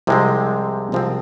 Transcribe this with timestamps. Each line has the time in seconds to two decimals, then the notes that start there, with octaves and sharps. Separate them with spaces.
0.07 C2 C3 F3 G#3 C4
0.92 C2 C3 F3 G#3 C4